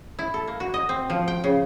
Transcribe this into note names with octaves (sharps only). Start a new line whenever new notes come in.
E4
A4
A#3
F#4
D#5
C4
F3
G5
C#3